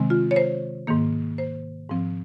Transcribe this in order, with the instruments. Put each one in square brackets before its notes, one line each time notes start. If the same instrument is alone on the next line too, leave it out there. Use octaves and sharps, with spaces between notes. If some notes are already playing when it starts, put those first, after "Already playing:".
Already playing: [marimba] C3 D#3 G#3 C4
F4
C#5
C5
G#2 D#3 A#3
C5
G#2 F3 C4